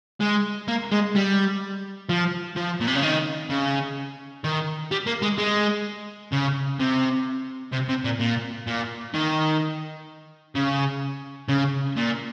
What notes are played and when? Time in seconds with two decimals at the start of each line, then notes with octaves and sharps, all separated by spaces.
0.21 G#3
0.68 A#3
0.92 G#3
1.15 G3
2.09 F3
2.56 F3
2.80 A#2
2.88 C3
2.96 C#3
3.03 D#3
3.50 C#3
4.44 D#3
4.91 G3
5.06 A#3
5.22 G#3
5.38 G#3
6.32 C#3
6.80 C3
7.73 C3
7.89 C3
8.04 A#2
8.20 A#2
8.67 A#2
9.14 D#3
10.55 C#3
11.49 C#3
11.97 A#2